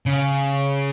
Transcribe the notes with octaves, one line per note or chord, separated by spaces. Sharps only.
C#3